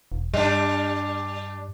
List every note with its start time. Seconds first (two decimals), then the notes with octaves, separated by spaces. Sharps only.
0.12 E1
0.34 G2 G3 D4